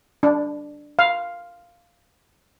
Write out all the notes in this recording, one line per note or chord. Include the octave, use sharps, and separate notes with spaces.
D4
F5